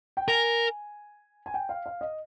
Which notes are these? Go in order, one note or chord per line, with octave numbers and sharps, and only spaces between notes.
G5
A#4 G#5
G#5
G5
F5
F5
D#5